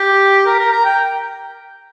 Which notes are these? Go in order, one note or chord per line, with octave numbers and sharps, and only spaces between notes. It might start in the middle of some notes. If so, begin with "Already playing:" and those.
Already playing: G4
A#4
A#4
A#5
G5